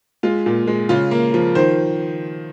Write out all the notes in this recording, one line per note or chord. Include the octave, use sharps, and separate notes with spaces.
G#3 F4
A#2
G#3
C#3 F4
A#3
F3
D#3 C5